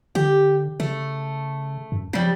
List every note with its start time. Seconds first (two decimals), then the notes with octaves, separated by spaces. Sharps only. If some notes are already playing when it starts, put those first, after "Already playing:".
0.15 D3 G4
0.80 C#3 A3
1.92 F#2
2.13 C#3 F3 G3